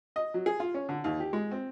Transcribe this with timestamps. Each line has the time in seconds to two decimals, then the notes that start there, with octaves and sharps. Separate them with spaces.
0.16 D#5
0.34 F#3
0.46 G#4
0.60 F4
0.74 C#4
0.89 D3
1.04 D#2
1.20 G4
1.33 G#3
1.51 C4